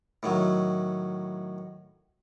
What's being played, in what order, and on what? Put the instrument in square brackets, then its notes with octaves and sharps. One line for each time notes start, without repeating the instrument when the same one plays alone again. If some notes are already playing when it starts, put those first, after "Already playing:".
[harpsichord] A2 D#3 F#3